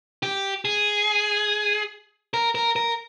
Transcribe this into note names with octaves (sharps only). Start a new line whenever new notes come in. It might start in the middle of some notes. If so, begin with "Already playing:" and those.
G4
G#4
A#4
A#4
A#4